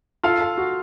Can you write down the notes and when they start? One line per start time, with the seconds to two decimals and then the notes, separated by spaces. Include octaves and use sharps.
0.23 F4 A4 F5
0.41 A4
0.58 F#4